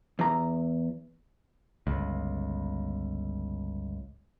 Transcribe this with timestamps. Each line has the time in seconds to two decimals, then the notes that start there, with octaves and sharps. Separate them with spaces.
0.19 E2 A#5
1.87 G1 C#2